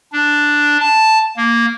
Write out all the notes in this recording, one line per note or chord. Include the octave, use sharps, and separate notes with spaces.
D4
A5
A#3